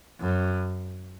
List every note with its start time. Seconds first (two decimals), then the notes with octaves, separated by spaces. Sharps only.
0.20 F#2